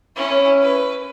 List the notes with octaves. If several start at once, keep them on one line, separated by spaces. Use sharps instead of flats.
C#4 E4
B4